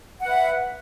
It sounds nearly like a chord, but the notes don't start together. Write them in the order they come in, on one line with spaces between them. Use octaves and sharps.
F#5 B4 E5